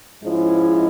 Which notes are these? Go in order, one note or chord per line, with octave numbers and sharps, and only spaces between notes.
G#2 F3 G#3 C#4 E4